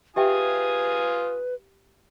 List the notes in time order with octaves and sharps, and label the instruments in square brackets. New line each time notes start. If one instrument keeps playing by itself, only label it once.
[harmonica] F4 G#5 D#6 [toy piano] G4 E5 G5 [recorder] B4